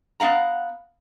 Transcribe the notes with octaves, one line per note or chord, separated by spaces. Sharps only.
B3 C4 F5 F#5 A#5